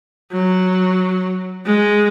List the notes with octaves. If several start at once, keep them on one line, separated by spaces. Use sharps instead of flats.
F#3
G#3